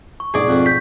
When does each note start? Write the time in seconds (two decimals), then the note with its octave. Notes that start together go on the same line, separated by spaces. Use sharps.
0.20 C#6
0.34 G#2 B2 A3 G#4 D5
0.47 F2
0.66 G6 B6